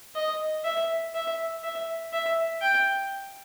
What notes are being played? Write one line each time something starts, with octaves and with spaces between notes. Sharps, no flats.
D#5
E5
E5
E5
E5
G5